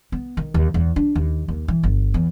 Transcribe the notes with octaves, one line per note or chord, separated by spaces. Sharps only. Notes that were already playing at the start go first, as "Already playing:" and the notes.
B3
D#3
D#2
E2
D4
D#2
D#2
E3
G1
E2